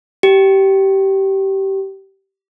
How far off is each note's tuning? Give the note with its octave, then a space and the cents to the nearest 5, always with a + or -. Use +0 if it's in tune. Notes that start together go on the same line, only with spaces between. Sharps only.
G4 -20